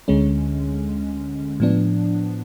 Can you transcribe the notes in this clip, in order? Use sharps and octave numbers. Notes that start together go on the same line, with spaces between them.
D2 D3 G#3 C#4
A2 F3 B3 D4